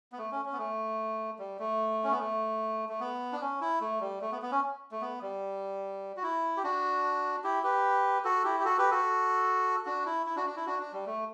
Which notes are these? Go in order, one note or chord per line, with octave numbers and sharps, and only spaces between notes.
B3
A3
C#4
C#4
B3
A3
G3
A3
C#4
B3
A3
A3
B3
D4
C#4
E4
A3
G3
A3
B3
B3
C#4
A3
B3
G3
F#4
E4
G4
D4 F#4
E4 G4
G4 B4
F#4 A4
E4 G4
G4
F#4 A4
G4 B4
F#4 A4
D4 F#4
E4
E4
D4 F#4
D4
E4
D4 F#4
D4
G3
A3